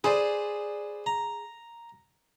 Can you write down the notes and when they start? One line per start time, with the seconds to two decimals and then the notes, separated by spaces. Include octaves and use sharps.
0.04 G#4 B4 C5 D5
1.06 A#5